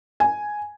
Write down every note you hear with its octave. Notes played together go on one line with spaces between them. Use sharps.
G#5